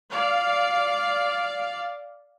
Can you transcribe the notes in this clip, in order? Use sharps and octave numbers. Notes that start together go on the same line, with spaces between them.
D5 F5